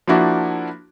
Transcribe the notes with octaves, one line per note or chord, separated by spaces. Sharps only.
F3 A#3 D4 E4 F#4